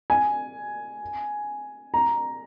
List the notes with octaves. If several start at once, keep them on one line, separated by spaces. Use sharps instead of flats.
G#5
A#5